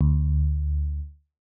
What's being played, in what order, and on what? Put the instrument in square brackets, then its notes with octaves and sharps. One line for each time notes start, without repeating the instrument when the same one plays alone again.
[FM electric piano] D2